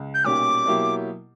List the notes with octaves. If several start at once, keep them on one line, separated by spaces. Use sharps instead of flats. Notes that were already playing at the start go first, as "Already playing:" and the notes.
Already playing: C#2
G6
B1 A#2 G3 C#4 G4 D6
B2 F#3 A#3 E4 G4